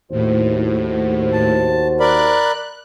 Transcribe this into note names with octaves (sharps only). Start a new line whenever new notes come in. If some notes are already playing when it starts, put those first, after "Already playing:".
D#2 A2 F#4 C5
A5
A#4 D5 B5 F#6